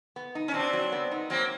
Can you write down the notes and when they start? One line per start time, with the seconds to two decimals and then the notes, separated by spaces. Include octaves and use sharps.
0.16 B3
0.35 D#4
0.48 C#4
0.54 B2 C4 D4
0.73 F#3
0.92 B3
1.11 D#4
1.30 F#3 A#3 C4